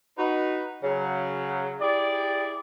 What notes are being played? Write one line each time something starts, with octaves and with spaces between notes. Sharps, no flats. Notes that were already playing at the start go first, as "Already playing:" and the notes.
D#4 F#4 B4
C#3 F#3
E4 G4 G#4 D5